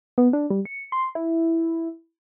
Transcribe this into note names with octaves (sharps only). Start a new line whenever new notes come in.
B3
D4
G3
C#7
C6
E4